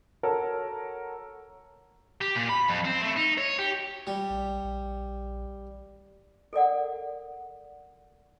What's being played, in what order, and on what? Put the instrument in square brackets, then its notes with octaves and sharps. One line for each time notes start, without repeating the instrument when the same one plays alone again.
[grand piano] F#4 A4 A#4 C#5
[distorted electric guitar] G4
A#2
B5
F2
C4
A3
D#4
C#5
G4
[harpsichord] G3
[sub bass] A#1
A#1
[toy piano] A4 A#4 D5 F#5